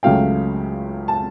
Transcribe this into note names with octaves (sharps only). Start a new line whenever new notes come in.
C#2 C#3 F#3 A3 F5 G5
A5